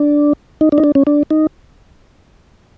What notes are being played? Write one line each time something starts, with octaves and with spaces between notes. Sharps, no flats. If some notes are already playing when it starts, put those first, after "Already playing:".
Already playing: D4
D#4
D4
D#4
D4
C#4
D4
D#4